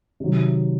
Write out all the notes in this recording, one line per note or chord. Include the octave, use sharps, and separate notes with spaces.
C3 D#3 F#3